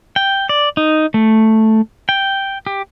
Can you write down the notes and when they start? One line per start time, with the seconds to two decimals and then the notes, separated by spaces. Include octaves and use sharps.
0.16 G5
0.49 D5
0.77 D#4
1.14 A3
2.09 G5
2.67 G4